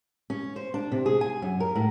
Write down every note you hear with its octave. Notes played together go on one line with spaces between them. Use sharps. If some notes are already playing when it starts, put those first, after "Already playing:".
C#4
C5
D4
C3
G#4
G#5
F#2
A#4
A2